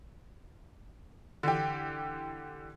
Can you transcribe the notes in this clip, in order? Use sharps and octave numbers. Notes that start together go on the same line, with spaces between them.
D3 E3 G4